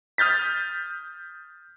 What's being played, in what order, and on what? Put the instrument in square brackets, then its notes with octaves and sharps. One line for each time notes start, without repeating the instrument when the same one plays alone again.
[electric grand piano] D#6 F6 G6 A6 B6